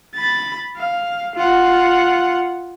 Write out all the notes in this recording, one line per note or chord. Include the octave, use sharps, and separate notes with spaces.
B5 A6
F5
F4 F#5